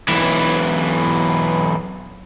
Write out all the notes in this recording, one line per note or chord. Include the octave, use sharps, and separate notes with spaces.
B1 E3